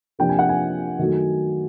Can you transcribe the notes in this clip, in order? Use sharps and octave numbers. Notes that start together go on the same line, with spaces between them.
C3 F3 A#3 D4 G5
G#5
F#5
G#5
D#3 F#3 A3